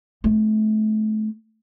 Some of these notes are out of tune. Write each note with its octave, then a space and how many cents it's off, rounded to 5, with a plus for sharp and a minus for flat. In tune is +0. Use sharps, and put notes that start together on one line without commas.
A3 -30 C4 +0